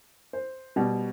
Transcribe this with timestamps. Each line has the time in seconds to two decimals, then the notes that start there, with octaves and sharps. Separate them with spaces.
0.33 C5
0.76 B2 G3